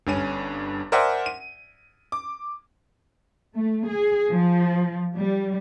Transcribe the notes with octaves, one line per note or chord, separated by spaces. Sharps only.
G1 G2 C#4 D#7
A#4 C5 D5 E5 F#5 G#5
D#7
D6
A3
G#4
F3
G3